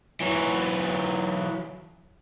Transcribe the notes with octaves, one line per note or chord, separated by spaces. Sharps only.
E3 F#3